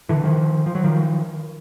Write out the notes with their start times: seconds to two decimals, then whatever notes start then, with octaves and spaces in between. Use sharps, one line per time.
0.09 D3 E3
0.24 D#3 F3
0.66 F3
0.75 F#3
0.84 D#3 F3